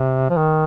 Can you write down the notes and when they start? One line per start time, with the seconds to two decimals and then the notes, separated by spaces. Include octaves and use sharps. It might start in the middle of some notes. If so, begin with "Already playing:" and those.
Already playing: C3
0.30 F3
0.37 D#3